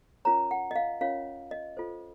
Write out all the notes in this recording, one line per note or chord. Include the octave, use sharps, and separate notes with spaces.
C#4 F4 A#4 C#5 A#5
F#5
D#5
F5
C#4 F4 A#4 C#5 F5
D#5
F4 A4 C5